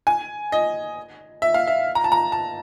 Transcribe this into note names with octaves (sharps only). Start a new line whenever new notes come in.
G#5
D#5
E5
F5
E5
A#5
A5
A#5
A5